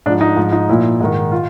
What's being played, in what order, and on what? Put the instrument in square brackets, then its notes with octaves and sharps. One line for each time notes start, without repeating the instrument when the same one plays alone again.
[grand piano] G#2 D4
F3
D#4
G#2 F3
D#4
A#2 F3 E4
G#2 D#3
F4